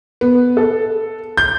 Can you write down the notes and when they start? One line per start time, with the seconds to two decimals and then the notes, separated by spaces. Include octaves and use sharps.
0.21 B3
0.57 A4
1.37 G6